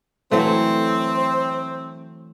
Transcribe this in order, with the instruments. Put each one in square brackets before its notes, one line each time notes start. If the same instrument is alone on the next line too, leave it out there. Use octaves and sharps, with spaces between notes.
[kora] E3 F#3 A3 [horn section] C4